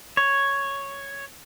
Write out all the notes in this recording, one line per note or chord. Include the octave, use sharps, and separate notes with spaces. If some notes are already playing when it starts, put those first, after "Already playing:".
C#5